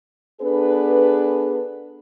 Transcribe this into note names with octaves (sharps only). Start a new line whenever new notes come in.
B3 D4 G#4 A4 B4